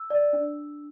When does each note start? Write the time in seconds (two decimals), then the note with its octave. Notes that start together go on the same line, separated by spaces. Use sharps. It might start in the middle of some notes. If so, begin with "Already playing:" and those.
Already playing: E6
0.10 D5
0.33 D4